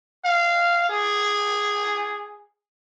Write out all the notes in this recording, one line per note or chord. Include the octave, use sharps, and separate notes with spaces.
F5
G#4